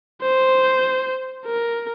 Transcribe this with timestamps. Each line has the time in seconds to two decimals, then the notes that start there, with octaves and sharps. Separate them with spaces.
0.22 C5
1.46 A#4